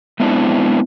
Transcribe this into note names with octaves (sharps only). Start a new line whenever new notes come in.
G#3 B3 C4 D4 E4